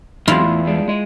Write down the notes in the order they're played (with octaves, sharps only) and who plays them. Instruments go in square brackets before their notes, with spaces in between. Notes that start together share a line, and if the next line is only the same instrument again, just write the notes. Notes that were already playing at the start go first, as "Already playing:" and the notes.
[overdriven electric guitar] E2 [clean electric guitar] F#3 G#3 C4 [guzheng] E4 F4 F5
[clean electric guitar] A2
G3 G#3 D4
G#3 D#5